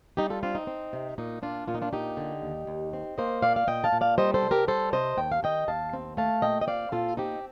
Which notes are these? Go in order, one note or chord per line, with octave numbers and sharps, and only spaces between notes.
G3 D#4 G4
F4 A4
C4 D4 F4
D#4
C4
C3
A#2 D#4
A#2 D4 F4
A#2 F4
D#4
D4 F4
A#2 D#4 G4
D3
D#2
D#2
C4
A#3 C5 D#5
A#2 D5 F5
F5
A#2 D#5 G5
F5 A5
A#2
D5 F5
G3 C5 D#5
A4 C5
C3
G4 A#4
G3 A4 C5
C3 C5 D#5
D#2 G5
F5
D#3 D#5 G5
D#2 F5 A5
C4
A3 F5 A5
A#2 D#5 G5
D#5
C4 D5 F5
A#2 F4 A4
C4 D#4 G4